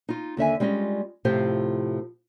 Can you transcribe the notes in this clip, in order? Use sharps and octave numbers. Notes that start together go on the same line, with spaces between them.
D#4 F4
D#2 D3 E5 G#5
G3 G#3 C#4 F4 D#5
A2 C3 F3 F4 G4 C5